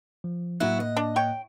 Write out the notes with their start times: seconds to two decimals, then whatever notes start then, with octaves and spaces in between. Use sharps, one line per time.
0.24 F3
0.60 A2 F#3 A#3 E4 F#4 F#6
0.80 D#5
0.97 D4
1.16 C#5 G5